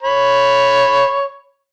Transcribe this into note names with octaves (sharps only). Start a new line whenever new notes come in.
C#5 B5